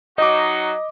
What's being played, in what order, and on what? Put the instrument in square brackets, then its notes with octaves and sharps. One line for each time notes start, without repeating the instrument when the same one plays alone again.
[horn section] F#3 D#4 F#4 [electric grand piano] D#5 D6